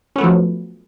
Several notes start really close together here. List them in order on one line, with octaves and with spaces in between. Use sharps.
C#4 B3 A3 F3 F#3